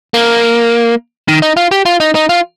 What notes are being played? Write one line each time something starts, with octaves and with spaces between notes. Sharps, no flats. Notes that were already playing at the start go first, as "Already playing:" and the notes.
A#3
D#3
D#4
F4
G4
F4
D#4
D#4
F4